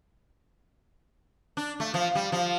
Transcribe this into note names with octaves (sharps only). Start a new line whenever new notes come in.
D4
A3
F3
G3
F3